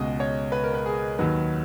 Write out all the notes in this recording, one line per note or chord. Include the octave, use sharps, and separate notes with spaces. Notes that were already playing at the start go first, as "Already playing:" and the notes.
Already playing: C#2 B2 G#3 D#5
C#5
B4
A#4
B4
G#4
D#2 D#3 F#3 B4